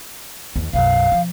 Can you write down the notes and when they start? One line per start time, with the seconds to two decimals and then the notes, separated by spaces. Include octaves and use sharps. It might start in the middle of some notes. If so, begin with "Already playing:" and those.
0.56 D#2
0.73 B1 F#2 F5
1.12 F3